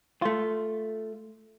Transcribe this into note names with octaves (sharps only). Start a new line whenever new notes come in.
A3 F4